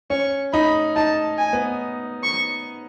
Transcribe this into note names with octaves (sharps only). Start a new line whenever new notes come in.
C#4 C#6
D#4 B5
D#4 A5
G#5
B3
C#6